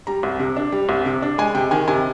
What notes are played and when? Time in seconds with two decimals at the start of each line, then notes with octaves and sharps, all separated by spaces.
0.07 G3 A#5
0.23 C2
0.40 C3
0.56 D4
0.72 G3
0.89 C2
1.06 C3
1.22 D4
1.38 G#3 G#5
1.54 C3 G5
1.71 D#3 G#5
1.87 C3 G#5